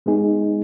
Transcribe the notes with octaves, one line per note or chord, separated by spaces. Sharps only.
G#3 B3 D#4 G#4